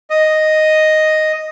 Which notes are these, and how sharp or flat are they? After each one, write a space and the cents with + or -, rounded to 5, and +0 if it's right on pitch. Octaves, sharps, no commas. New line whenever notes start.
D#5 +0